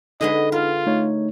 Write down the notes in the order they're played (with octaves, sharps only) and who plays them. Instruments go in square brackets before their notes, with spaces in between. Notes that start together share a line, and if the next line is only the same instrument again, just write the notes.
[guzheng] D3 G#3 B3 [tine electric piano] D#4 [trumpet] D#5
[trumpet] F4 [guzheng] A#4
[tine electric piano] A3 D#4 C#5